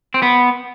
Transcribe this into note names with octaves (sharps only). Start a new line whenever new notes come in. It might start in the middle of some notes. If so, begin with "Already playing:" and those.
C4
B3